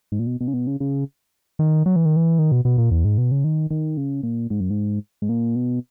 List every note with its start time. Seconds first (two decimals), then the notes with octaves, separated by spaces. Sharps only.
0.12 G#2
0.19 A#2
0.27 B2
0.41 B2
0.48 C#3
0.54 B2
0.67 C#3
0.80 C#3
1.59 D#3
1.86 F#3
1.96 E3
2.05 D#3
2.16 E3
2.39 D#3
2.52 B2
2.65 B2
2.78 A#2
2.91 E2
3.05 G#2
3.18 B2
3.31 C#3
3.44 D#3
3.71 D#3
3.97 C#3
4.23 A#2
4.50 G#2
4.61 F#2
4.70 G#2
5.22 G#2
5.29 A#2
5.56 B2